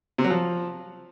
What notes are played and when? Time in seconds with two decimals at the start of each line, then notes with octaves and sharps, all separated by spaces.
0.18 C3
0.24 F#3
0.30 F3